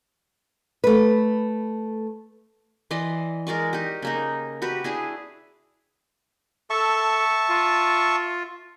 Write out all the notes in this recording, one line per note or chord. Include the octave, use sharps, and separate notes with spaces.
A3 B4
E3 D5 D#5 C6
G#3 A#4 D5 C#6
D#4 G4
C#3 A#3 D#4
F#4 G4 B4
D4 E4 G#4
A4 E5 A5 C#6
F4